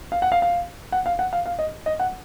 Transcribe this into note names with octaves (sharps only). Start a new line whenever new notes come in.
F5
F#5
F5
F5
F#5
F5
F#5
F5
F5
D#5
D#5
F#5